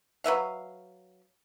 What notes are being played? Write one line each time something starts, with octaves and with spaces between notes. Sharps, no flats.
F#3 B4 E5 F5